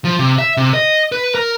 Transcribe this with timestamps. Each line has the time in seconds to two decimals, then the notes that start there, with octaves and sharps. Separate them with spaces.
0.05 F3
0.19 C3
0.38 E5
0.57 C3
0.74 D#5
1.12 B4
1.35 A#4